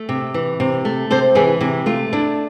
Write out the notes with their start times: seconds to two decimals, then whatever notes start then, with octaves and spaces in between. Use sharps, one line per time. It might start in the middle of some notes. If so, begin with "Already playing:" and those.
Already playing: A3
0.09 C3
0.34 E3
0.60 C3
0.85 A3
1.10 C3 A4 C5
1.35 E3 E4 G#4
1.61 C3 E4
1.86 A3 F4
2.13 D4 E4